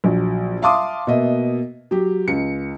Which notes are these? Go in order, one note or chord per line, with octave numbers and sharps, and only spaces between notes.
A#1 F#3
E5 F5 A5 C6 D6 D#6
B2 A#3 D#5 E5
F#3 G4
C#2 C#7